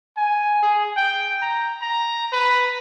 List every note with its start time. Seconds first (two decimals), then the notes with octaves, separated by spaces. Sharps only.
0.17 G#5
0.62 G#4
0.97 G5
1.42 A#5
1.81 A#5
2.32 B4